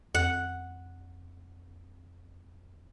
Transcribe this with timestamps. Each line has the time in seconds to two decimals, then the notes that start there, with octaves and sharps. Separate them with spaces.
0.15 F2 F#5